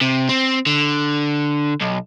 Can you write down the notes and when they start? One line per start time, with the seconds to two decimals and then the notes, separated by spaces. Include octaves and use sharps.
0.01 C3
0.29 C4
0.67 D3
1.81 B1